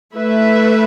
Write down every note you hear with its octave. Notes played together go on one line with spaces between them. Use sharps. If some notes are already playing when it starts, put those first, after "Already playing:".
A3 E4 B4 E5